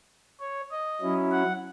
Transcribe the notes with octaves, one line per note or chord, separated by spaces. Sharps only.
C#5
D#5
F#3 C#4 E4
F#5